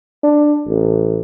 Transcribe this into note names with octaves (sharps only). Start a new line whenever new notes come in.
D4
A1